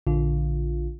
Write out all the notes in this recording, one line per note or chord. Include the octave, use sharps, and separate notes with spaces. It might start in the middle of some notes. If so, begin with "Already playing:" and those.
A#1 D3 F4